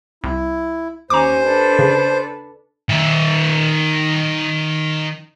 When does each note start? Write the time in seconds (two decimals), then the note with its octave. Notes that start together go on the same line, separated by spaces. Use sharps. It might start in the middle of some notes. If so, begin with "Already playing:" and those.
0.24 C2 E4
1.10 D#2 C#4 C5 G#5 A#5 D6
1.43 D4 A4 B4
1.79 C#3
2.89 D#3 E5